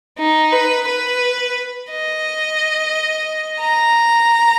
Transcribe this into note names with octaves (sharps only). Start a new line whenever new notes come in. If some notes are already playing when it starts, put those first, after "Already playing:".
D#4
B4
B4
D#5
A#5